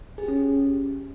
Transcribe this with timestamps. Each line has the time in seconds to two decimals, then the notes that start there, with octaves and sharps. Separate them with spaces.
0.18 G#4
0.23 G4
0.28 C#4